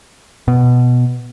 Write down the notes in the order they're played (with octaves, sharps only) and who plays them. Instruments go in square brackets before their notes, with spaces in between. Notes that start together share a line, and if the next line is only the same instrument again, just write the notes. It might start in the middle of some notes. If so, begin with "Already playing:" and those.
[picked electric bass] B2